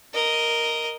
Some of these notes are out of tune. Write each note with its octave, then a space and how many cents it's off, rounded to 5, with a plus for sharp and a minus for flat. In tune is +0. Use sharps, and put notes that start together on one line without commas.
A#4 +0 D#5 +0